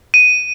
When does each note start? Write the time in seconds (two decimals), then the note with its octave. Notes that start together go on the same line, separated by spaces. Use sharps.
0.14 D#7